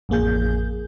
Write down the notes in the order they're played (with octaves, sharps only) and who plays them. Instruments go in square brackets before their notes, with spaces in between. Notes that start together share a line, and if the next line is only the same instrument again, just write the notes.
[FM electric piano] A1 F2 A#3 G#4 G6